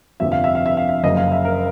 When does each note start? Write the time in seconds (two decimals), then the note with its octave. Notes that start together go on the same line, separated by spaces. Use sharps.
0.20 G1 F2 C3 F3 E5
0.32 F5
0.44 E5
0.55 F5
0.66 E5
0.77 F5
0.89 E5
1.03 F#1 F#2 C#3 F#3 D#5
1.17 F5
1.32 E5
1.45 A#4